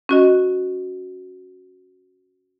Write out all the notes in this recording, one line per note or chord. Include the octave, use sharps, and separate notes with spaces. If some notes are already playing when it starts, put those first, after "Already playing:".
C#4 F#4 D#5